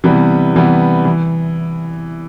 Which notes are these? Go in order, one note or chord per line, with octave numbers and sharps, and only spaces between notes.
C3 E3 G3 B3
C3 E3 G3 B3
E3